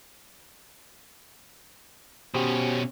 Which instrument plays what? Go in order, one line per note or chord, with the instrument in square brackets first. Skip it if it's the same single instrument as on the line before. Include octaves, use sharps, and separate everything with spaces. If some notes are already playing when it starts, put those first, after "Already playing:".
[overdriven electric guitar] B2 C#4 [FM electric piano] F#4 G4 C5